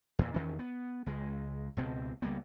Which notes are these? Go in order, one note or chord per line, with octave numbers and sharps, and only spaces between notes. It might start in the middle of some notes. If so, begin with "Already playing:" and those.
E2 A#2
E2 D#3 C#4
B3
C#2 G#3
C#2 B2 C4
C#2 G3 A#3 B3